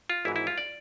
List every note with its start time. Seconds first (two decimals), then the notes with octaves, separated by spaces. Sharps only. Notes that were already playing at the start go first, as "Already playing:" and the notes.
0.10 F4
0.25 G#1 G#2 E3 E4
0.36 E4
0.47 F4
0.58 D5